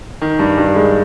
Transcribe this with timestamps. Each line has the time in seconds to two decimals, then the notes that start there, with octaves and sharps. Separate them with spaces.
0.21 D#3
0.39 G2
0.58 G2
0.76 G#3